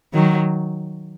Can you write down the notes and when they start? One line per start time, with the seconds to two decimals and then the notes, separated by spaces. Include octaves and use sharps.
0.14 D#3 F#3